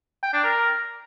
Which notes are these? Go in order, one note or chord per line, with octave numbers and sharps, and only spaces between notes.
G5
D4
A#4